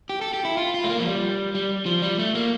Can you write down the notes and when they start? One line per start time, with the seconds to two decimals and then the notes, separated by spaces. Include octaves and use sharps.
0.09 G4
0.21 A4
0.33 G4
0.45 E4
0.57 F4
0.74 F4
0.84 A3
0.89 A#3
0.99 F3
1.05 G3
1.55 G3
1.86 F3
2.02 G3
2.19 A3
2.35 A#3